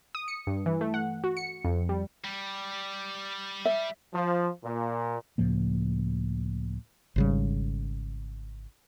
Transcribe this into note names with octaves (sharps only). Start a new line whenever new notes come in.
D#6
C#7
G2
E3
A3
F#5
F#4
C#7
F2
G3
G3
E5
F3
A#2
C#2 A2 F3 A#3
G#1 C#3 G3